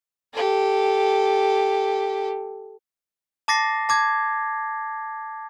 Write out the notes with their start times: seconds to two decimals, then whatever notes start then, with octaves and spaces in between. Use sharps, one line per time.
0.34 G4 A4
3.48 A5 D6 A6 A#6 C7
3.89 A5 D6 G#6